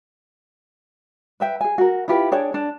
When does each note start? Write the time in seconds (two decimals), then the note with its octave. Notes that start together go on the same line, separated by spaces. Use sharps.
1.40 B4 E5 G5
1.61 G#4 G#5
1.78 F#4 A#4
2.08 E4 F4 G4 B4
2.32 D4 G#4 C#5 G5
2.54 D4